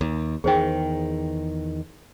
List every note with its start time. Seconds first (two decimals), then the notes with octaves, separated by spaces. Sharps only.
0.01 D#2
0.44 E2 D#3 G#4 C5 G5